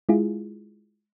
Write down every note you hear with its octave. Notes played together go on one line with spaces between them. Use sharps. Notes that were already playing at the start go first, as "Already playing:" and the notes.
G#3 E4 F4 G#4